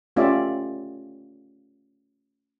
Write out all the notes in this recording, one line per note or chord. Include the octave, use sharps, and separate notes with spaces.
A3 C#4 F4 G4 D5 E5